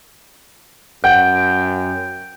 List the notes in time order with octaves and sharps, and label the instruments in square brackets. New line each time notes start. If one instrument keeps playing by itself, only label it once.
[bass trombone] F#2 [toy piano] F#5 [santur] G5